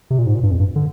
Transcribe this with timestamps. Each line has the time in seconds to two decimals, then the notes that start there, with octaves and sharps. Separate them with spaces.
0.10 C3
0.19 A#2
0.26 G#2
0.35 A#2
0.43 G2
0.51 F2
0.60 G2
0.76 D3